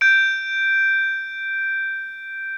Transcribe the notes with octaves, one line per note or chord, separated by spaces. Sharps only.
G6 D7